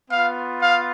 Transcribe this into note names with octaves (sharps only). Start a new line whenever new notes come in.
B3 F4 F5
F5